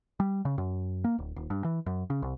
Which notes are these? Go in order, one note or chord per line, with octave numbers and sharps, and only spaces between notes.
G3
C#3
F#2
A#3
D1
D#1
G2
E3
F#2
C#3
C2